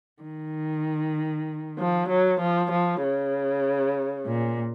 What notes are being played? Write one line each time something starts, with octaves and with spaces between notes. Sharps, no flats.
D#3
F3
F#3
F3
F3
C#3
A#2